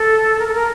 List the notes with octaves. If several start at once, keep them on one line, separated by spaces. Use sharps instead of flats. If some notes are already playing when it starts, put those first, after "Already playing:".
Already playing: A4
A#4
A4
A#4